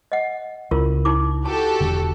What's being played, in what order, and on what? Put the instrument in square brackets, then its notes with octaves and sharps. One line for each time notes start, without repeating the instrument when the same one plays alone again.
[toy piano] D#5 F#5
[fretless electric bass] C#2 [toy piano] E4 F4 A#4
[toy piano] D#4 E4 D6
[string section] F#4 G4 A4 [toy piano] A5
[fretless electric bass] E1 D3